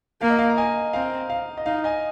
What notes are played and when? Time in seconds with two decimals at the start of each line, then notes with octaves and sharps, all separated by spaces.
0.21 A#3 F5
0.30 D#5
0.39 F5
0.50 A#5
0.57 D#5 G#5
0.93 C4 F5 A#5
1.30 F5
1.58 D#5
1.66 D#4 F5
1.84 D#5 G#5